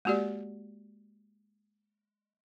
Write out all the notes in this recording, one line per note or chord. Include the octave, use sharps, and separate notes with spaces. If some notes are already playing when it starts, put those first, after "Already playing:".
G#3 A#3 F#4 G4 D5